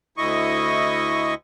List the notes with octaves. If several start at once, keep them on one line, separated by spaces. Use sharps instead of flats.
D2 E4 D#5 C#6